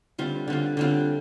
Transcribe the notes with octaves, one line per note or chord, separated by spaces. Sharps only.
D3 G3 C4 F4
D3 G3 C4 F4
D3 G3 C4 F4